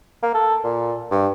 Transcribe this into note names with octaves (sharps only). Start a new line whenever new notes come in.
A#3
A4
A#2
G2